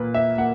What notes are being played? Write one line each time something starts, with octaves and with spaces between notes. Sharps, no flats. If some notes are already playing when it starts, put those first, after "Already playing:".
Already playing: A#2 A#3 B4
E5
A#3 F#5